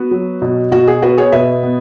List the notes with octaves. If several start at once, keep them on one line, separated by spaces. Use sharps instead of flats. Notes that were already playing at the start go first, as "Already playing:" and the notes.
Already playing: B3 F#4 B4
F#3
B2
B2 F#4
G#4
B3 F#4 B4
G#4 C#5
B2 B4 E5
B3